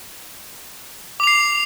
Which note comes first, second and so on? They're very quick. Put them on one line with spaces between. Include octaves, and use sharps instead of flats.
D6 F7 C7